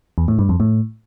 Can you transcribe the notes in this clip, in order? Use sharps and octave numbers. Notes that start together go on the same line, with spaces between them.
E2
A2
G2
F2
A2